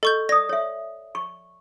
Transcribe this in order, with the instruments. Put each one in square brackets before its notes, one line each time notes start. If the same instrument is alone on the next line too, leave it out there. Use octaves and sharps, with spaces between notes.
[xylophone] A4 C#6 G6 [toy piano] D#5
[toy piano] D5 D#6 [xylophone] A#6
[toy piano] C#5 E5
C#6